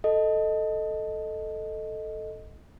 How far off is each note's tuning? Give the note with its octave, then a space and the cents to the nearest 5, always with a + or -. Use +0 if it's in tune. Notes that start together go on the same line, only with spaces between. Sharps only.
A4 +0 D#5 +0